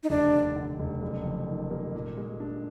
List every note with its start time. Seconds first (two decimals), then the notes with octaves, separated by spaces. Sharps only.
0.03 D#4
0.10 F1 D4
0.34 D#2
0.56 D3
0.80 F1
1.02 F#1
1.25 F2
1.48 D#3
1.71 A#3
1.95 A#2
2.17 G#3
2.40 D4